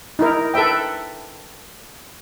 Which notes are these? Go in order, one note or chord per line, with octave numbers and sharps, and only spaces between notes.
D#4 E4 A#4
A4 B4 E5 G5